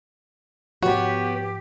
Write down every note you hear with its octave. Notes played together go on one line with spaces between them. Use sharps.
G#2 F3 B3 F#4 G4 C#5